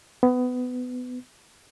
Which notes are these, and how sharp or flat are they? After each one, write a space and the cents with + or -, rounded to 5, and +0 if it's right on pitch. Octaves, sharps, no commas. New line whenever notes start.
B3 +20